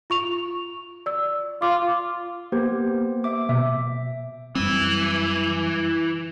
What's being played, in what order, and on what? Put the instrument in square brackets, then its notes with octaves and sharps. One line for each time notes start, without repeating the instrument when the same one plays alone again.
[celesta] F4 C#6 F7
D5 E6
[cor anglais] F4 [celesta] D6
[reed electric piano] A#3 [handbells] B3 G4 C5
[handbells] E5 D6
[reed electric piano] B2 [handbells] E5
[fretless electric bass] F#2 G3 C4 [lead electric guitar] E3